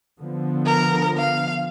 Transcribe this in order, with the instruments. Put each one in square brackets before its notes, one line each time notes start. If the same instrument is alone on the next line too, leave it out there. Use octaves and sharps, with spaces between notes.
[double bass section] D3 F3 B3
[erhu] A#4
F5